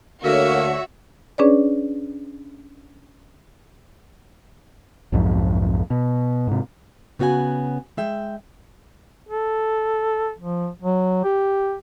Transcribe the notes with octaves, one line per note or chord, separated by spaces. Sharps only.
D2 D3 A#3 F#4 C#5 E5
C#4 D4 G#4 B4 C#5 D5
B1 F2 G#2 F3
B2
G#2 C3
C#3 B3 F#4 E5 G#5
G#3 E5 G5
A4
F3
F#3
G4